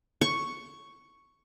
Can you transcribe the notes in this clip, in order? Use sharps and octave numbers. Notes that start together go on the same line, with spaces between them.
C#6